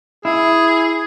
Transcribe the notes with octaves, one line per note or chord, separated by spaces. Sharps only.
E4 G#4